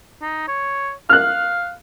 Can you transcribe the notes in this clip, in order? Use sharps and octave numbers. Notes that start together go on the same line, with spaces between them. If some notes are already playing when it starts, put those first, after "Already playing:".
D#4
C#5
F5 F6 F#6